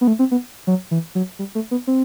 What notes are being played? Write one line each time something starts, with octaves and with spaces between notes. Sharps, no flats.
B3
A3
C4
B3
F#3
E3
F#3
G3
A3
B3
C4